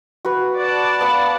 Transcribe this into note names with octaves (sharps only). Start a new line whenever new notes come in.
F#4 B4
D5 F#5 A5
B3 F5 B5